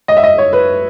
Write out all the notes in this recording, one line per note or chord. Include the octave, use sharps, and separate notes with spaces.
D#5
E5
D#5
C#5
B4